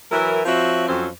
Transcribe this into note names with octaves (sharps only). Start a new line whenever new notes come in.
E3 F#3 E4 A#4
F3 C4 F#4 C#5 E5
F2 F#3 C4 C#4 C5